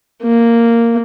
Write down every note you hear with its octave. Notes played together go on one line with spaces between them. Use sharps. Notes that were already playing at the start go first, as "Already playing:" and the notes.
A#3